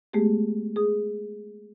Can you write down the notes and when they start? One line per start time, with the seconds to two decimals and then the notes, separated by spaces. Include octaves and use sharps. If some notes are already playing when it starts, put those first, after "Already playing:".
0.13 G#3 A3 B3 G4 G#4
0.76 G#4 D#6